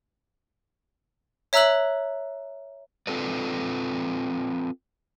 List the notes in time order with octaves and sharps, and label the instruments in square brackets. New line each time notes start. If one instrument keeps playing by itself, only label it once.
[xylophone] C#5 E5 A#5 E6 F#6 F#7
[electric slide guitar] C4 F4 A4 B4 D5